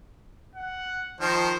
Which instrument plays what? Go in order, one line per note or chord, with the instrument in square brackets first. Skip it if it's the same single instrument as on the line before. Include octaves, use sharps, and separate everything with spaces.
[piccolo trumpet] F#5
[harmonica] D#3 F3 [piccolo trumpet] C5